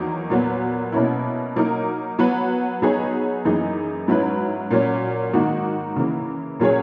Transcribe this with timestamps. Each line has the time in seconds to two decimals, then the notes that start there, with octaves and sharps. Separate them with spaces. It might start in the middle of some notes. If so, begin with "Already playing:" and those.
Already playing: E2 D#3 F#3 A#3 D#4
0.30 A#2 F#3 B3
0.92 B2 A#3 C#4 E4
1.56 F#3 A#3 D#4 A#4
2.19 F#3 B3 F#4 B4
2.82 F#3 B3 D#4 G#4 C#5
3.45 F#2 E3 A#3 D#4 G#4
4.08 G#2 F#3 C#4 E4 B4
4.71 A#2 F#3 C#4
5.33 G#2 D#3 A#3 D#4 F#4
5.96 C#3 E3 A#3
6.60 A#2 F#3 C#4 G#4 C#5